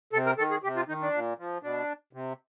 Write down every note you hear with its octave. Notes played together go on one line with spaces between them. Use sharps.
C3 A4
A#4
D#3 A4
G#4
C3 G4
F4
D#3 D#4
D4
A#2
F3
B2 D4
C3